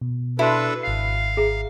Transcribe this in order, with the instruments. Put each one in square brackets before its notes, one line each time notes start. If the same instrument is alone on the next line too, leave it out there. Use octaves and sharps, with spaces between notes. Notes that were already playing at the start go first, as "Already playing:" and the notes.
[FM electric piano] B2
[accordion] D4 A4 B4 [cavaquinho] E4 [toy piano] F#4 C6
[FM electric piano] G#1 C7 [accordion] F5
[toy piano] G#4 E5 A#5